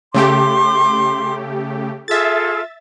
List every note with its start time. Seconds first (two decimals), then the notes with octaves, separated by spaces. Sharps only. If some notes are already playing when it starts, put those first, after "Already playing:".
0.14 C#3 A3 G4 C6 D6
2.08 F4 G#4 A4 E5 A6